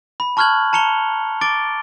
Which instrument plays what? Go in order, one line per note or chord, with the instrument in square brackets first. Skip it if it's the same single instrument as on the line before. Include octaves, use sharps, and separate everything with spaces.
[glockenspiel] B5
A5 C#6 F6 F#6 G#6 F#7
A5 A#5 C#7 F7 G7
D6 A6 D7 G7